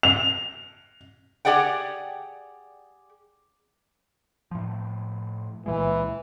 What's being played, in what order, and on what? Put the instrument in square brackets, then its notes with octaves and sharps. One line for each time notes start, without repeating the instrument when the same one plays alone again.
[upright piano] F7
[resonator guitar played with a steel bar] G4 G#4 D5 F#5 G5
[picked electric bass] A2 F3
[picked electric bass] C#2 A#2 G#3 [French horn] E3